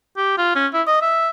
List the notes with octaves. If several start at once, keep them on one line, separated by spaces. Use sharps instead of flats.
G4
F4
C#4
E4
D#5
E5